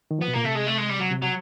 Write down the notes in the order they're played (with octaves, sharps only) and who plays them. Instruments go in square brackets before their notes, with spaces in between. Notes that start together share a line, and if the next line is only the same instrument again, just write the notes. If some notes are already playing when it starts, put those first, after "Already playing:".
[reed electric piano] D#3
[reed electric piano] F3 [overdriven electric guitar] B3
[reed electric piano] B2
[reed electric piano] A#2 [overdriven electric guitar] A#3
[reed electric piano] C3 [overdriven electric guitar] A3
[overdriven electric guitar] G#3
A3
G#3
G3
F#3
[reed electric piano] C3
[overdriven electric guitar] F#3